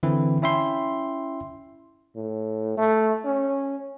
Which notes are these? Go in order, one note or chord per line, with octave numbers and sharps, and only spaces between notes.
D3 E3 C4 E4
C#4 E4 E5 G5 C6
A2
A3
C#4